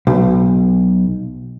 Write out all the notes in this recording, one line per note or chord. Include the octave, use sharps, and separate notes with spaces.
B1